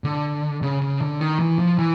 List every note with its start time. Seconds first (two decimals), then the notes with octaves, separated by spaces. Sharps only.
0.04 D3
0.62 C#3
0.81 C#3
1.01 D3
1.20 D#3
1.39 E3
1.59 F3
1.79 E3